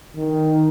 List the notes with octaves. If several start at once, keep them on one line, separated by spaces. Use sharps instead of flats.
D#3